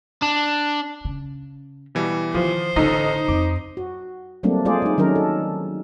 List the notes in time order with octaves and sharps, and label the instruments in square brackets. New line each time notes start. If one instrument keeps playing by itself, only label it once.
[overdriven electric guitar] D4
[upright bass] C#3
[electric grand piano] B2 E3 G3
[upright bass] D#3 [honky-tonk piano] F3 [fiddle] C5
[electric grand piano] A1 A4 [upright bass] D3 F4 [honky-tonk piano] D#4
[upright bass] F2 [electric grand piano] D6
[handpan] F#4
F#3 G3 A3 A#3 C4 D4
G#3 A3 F4 G#4 C5 D5
G#3 D#4
D#3 F#3 C#4 D4 A#4
A4